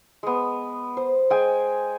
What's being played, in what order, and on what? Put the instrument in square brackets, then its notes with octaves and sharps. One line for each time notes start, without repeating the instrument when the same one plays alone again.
[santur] G#3 B3
C5
G#3 G5 G#5